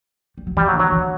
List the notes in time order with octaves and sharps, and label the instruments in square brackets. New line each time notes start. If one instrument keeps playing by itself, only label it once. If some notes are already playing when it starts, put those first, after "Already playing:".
[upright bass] G3
F#3
[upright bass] E3 [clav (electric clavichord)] G3
[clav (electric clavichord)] F#3
[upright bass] D3
[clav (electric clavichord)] F#3
[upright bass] D3
E3